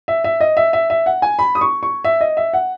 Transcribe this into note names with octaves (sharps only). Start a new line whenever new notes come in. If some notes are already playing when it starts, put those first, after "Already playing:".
E5
E5
D#5
E5
E5
E5
F#5
G#5
B5
D#6
C#6
C#6
E5
D#5
E5
F#5